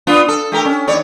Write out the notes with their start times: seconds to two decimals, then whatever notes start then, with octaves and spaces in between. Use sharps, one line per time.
0.07 B3 D4 F4
0.28 A4
0.52 A3 G4 A#4
0.65 C#4
0.88 D#2 C#5 D5